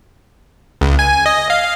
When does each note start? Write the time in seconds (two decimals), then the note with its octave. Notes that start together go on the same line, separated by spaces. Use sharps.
0.81 C#2
0.99 G#5
1.26 D#5
1.50 F5